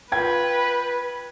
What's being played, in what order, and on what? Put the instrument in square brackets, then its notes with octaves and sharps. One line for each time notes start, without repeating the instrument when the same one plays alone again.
[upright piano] F4 G5 G#6 [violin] B4